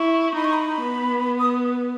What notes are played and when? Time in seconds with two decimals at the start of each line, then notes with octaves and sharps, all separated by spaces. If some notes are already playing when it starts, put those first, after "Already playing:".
Already playing: E4 C#6
0.35 D#4 B5
0.44 C#6
0.53 B5
0.82 B3
1.39 D#6